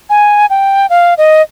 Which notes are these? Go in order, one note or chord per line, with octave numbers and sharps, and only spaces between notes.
G#5
G5
F5
D#5